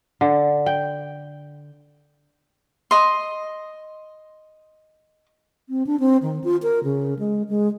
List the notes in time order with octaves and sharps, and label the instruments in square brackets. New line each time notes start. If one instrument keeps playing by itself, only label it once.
[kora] D3
G5
[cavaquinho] D#5 C6
[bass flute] C4
D4
C4
D#3
F4
A#4
C#3
G#3
G#3